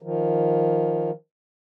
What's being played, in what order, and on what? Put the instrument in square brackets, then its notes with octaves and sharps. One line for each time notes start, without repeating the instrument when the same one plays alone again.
[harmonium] D#3 F3